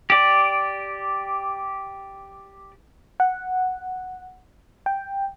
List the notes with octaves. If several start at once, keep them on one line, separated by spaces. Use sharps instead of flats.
G4 D5
F#5
G5